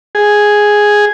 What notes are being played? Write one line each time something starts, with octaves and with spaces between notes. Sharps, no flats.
G#4